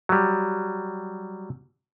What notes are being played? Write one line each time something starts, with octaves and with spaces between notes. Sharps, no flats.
F#3 G3